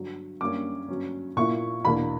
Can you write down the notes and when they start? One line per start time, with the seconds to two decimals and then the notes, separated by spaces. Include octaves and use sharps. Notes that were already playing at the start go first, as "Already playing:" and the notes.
Already playing: G2 D3 F#3
0.41 F#2 D3 G3 A#3 C#4 D6
0.89 G2 D3 F#3 C#4
1.37 A#2 A#3 E4 C#6
1.85 E2 B2 A#3 D4 B5